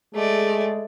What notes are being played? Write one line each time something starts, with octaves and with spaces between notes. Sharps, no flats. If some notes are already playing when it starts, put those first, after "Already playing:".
G#3 A3 G#4 D5